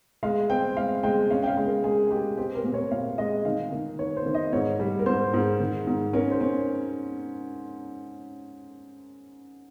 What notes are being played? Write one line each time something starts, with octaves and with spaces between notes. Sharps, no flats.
G#3 F5
C4 G5
G#3 F5
G#3 G5
C#4 F5
G5
F5
G#3
A#4
G#3 G#4
G#3 G4
C4 G4
A#4
A#2
C#5
A#2 F5
G#3 D#5
D#3 F5
D#3
D#3 C#5
C5
D#3
D#5
G#2 C#5
G3
A#4
G#2 C5
G#2
D#3
G#2
C#4 A#4
C5
C#4